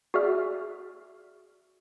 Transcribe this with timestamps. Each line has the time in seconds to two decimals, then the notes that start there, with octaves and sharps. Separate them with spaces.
0.14 F#4 G#4 D5 E5 F6